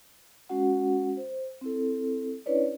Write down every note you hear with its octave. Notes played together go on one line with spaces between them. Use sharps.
G#3 C#4 F#4 F#5
C5
C4 E4 A4
C#4 D4 E4 B4 C#5 D5